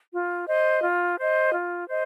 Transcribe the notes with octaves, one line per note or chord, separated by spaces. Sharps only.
F4
C5 D#5
F4
C5 D#5
F4
C5 D#5